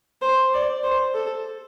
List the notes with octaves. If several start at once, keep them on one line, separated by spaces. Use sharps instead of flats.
C5
D5
C5
A4